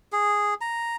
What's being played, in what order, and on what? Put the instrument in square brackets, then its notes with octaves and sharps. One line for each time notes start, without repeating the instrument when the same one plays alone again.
[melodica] G#4
A#5